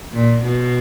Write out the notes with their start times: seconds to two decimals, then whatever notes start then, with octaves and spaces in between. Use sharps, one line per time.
0.14 A#2
0.43 B2